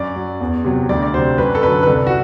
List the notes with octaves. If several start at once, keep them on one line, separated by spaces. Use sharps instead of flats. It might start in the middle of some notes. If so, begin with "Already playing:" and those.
Already playing: F#2 D5
F#3
E2
C3 F#3
D2 D5
D5
C3 F#3 C5
F#2 B4
A4
D3 F#3 B4
B4
C2 A4
F#4